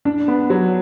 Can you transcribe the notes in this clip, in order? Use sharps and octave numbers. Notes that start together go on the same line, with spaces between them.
D4
B3
F#3